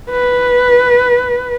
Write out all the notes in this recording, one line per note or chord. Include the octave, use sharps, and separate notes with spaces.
B4